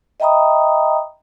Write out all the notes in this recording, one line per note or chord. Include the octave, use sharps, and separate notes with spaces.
D#5 E5 G5 A#5 B5 D#6